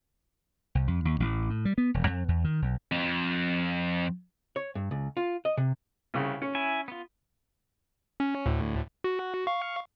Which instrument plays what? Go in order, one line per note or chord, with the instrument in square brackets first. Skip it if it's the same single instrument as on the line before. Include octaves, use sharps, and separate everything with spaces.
[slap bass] C2
F2
D#2
A1
A2
G3
B3
E1
F2
E2
D#3
B1
[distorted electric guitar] F2
[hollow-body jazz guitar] C#5
G2
C#2
F4
D#5
C3
[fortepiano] C2 C#3
C#4
[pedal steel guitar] E4 G#5
B3 F4
[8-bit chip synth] C#4
D2 A2
F#4
F5 C#6